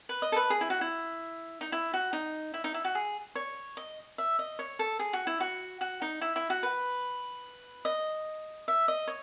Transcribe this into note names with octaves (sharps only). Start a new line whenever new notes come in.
B4
D#5
A4
B4
G#4
E4
F#4
E4
D#4
E4
F#4
D#4
E4
D#4
E4
F#4
G#4
C#5
D#5
E5
D#5
C#5
A4
G#4
F#4
E4
F#4
F#4
D#4
E4
E4
F#4
B4
D#5
E5
D#5
C#5